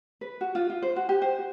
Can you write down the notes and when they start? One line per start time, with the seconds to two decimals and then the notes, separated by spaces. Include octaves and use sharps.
0.21 B4
0.41 F#4
0.55 F4
0.70 F4
0.82 C5
0.96 F#4
1.09 G4
1.22 C5
1.39 F#4